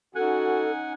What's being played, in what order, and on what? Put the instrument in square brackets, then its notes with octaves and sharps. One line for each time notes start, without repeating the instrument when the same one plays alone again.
[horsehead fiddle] C#4 D#4 [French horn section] F#4 [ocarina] A4 [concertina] F#5 G#5